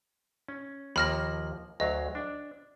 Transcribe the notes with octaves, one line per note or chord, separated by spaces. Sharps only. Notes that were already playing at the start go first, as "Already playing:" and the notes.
C#4
D#2 F3 A#3 B5 F6 A#6
D2 F#3 D#5 F5
D4